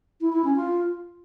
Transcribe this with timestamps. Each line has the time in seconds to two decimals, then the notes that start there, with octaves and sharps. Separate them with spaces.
0.21 E4
0.33 E4
0.44 C#4
0.56 F4